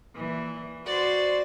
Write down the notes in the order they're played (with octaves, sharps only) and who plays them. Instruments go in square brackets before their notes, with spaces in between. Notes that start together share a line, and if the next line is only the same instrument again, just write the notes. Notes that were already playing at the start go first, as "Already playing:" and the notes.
[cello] A#2 E3
[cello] F#4 C5 [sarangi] D5